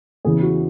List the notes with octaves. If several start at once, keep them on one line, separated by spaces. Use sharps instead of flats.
E2 C#3 E3 G#4
F#4